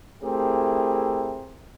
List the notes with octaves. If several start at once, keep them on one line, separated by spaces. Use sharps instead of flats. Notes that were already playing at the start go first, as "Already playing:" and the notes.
A3 C4 E4 G4 G#4 A#4